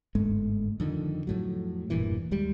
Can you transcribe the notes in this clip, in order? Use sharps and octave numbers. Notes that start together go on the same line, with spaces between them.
G1 G#2 G#3 A3
F2 D3 D#3
F2 A2 F#3
E1 G2 A#2 E3
D#2 G3 G#3